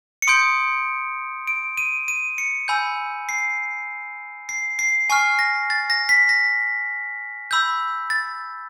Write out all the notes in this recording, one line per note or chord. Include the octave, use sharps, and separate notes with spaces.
C#7
C6 D#6 G6 D7
D7
D#7
D#7
C#7
G#5 B5 E6 G6
C7
C7
C7
G#5 C#6 F6 C7
A#6
A6
A#6
B6
A#6
B5 E6 G6
A6